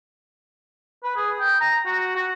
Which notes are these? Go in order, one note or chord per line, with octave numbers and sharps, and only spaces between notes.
B4
G#4
G5
A#5
F#4
F#4